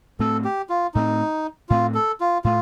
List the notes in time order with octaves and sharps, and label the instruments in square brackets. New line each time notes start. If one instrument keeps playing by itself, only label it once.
[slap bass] A2 A3 C4 [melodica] A4
[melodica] G4
F4
[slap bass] A2 A3 C4 [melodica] D#4
[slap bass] A2 A3 C4 [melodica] F4
[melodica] A4
F4
[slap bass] A2 A3 [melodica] F4